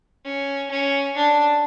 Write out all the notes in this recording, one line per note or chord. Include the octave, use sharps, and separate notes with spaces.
C#4
C#4
D4